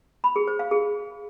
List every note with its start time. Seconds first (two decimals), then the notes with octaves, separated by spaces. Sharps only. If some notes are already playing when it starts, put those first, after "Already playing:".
0.24 B5
0.36 G#4
0.48 C5
0.59 F5
0.71 G#4